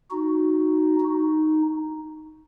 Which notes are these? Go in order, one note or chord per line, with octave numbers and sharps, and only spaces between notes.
D#4 F#4
D#4